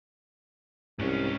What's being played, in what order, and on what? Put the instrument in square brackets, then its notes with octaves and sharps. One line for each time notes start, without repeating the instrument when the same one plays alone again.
[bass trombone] C2 [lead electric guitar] G#2 C#4